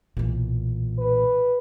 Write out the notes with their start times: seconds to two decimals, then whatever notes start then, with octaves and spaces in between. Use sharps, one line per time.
0.17 B1 A#2 E3
0.99 B4